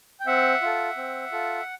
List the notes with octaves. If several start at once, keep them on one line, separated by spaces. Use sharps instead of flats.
G5
C4 E5 F#5
F4 A4
C4
F4 A4